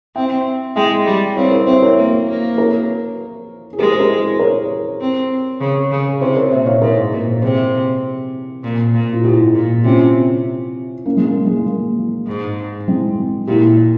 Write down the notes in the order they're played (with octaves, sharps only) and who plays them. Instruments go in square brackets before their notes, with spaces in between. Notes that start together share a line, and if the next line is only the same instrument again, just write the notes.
[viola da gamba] C4 [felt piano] E5 G5
[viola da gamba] G#3 [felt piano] E5 G5
[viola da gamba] G3
[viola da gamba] C4 [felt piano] C#5 F5
[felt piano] A#4 C#5
[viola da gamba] C4 [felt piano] C5 E5
[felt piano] A#4 C#5
[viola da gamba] A#3
A#3
[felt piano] A#4 C#5
G#4
[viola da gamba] G#3 [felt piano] G4 A#4
[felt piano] C5
G4 A#4
G#4 C5
A#4 C#5
[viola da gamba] C4
C#3
C#3
[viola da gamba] C3 [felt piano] G#4 C5
[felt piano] A#4 C#5
[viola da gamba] A#2 [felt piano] C5 E5
[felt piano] C#5 F5
[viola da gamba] G#2 [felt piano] A#4 C#5
[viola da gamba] A#2
[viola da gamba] C3 [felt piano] G#4 C5
[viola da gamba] A#2
A#2
[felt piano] F4
[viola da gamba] G#2 [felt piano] E4 G4
[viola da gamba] A#2
[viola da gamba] C3 [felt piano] C#4 F4
[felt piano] A#3 C#4
G#3
A#3
G#3
A#3
[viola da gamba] G#2
[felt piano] G#3 C4
[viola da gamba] A#2 [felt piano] E4 G4